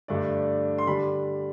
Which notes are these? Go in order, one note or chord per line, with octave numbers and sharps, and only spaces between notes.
G2 D3 A3 D4 D5
C6
D3 G3 D4 B5